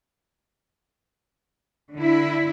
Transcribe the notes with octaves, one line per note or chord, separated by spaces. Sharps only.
D3 E4